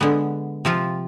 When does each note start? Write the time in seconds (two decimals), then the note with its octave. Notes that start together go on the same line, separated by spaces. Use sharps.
0.01 D3 G#3 B3
0.65 C3 F3 C4 F4